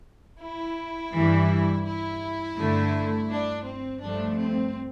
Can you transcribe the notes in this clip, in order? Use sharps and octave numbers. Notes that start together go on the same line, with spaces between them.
E4
G2 E3 G3
E4
G2 D3 A3
D4
C4
G2 F3 A3 D4
C4